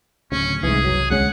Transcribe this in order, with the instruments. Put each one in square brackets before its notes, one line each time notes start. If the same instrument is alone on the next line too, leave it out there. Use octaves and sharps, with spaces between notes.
[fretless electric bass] D1 D2 [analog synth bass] C#3 [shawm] C#4
[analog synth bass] C2 [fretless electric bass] G#2 E3 [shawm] G#4
[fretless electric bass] F#1 F#3
[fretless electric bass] D2 G#3 C#4 [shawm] F#5